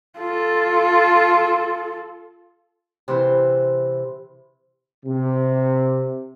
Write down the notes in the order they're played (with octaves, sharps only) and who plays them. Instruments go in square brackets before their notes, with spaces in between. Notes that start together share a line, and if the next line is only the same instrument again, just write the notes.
[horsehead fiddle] F4 A4
[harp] C3 E3 E4 C5
[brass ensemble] C3